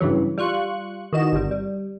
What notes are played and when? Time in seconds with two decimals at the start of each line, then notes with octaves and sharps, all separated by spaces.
0.01 G2 C#3 E3 F#3
0.38 G3 F4 C#6 F#6
1.13 D#3 E3 F#4 D#5 E7
1.32 G1 C3 G3
1.51 G3